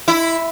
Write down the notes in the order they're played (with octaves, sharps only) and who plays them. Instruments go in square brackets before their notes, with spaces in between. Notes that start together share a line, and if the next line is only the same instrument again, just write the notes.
[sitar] E4